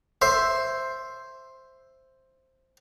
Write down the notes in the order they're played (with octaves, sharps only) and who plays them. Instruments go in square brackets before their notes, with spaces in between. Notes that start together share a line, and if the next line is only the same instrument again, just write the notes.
[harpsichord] C5 E5